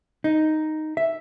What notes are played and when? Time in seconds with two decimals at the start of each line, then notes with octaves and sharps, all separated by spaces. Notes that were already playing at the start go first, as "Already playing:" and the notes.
0.24 D#4
0.97 E5